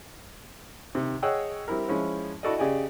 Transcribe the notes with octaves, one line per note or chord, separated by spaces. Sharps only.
C3 D#3
G#4 C#5 D#5 F#5 G5 E6
G3 C4 E4 A#4
F3 G#3 C#4 E4
E4 F#4 A4 D5 D#5
C#3 G4 G#4 D5 D#5 G#5